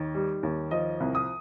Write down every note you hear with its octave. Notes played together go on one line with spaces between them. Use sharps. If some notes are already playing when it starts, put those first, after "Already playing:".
Already playing: D#2 D#3
G3
D#2
F3 D#5
C2
D#6